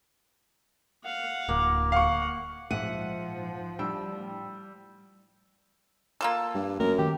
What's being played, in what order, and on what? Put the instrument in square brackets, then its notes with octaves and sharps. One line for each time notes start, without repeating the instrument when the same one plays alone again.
[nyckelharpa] F5 F#5
[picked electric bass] D1 [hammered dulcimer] A#3
[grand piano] F5 C#6 [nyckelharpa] F#5
[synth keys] A#1 G#2 [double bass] F3 [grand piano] E5 D#7 [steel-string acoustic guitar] F#5
[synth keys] A2 D4 G5 [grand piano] G3 E6
[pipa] A#3 F4 A4
[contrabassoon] G2
[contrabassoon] F#2 [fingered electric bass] A3 A#3 [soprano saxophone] A#4
[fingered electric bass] D#3 [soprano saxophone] G4